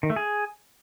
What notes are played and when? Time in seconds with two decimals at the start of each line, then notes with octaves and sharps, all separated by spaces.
0.03 D#3
0.10 A3
0.16 G#4